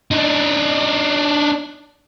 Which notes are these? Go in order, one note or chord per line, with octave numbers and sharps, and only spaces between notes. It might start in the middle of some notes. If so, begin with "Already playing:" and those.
D4 D#4